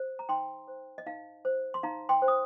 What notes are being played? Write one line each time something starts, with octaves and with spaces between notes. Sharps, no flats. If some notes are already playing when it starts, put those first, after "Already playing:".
Already playing: C5
A#5
D#4 G5 C6
C5
D#5
D#4 F5
C5
C6
D#4 F5 A#5
G5 C6
C5
D#6